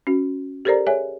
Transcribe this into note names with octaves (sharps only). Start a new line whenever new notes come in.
C#4 F#4
G4 A4 A#4 C5 D5 A#5
G#4 C#5 E5 G#5